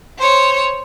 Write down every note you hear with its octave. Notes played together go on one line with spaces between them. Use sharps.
C5 C#5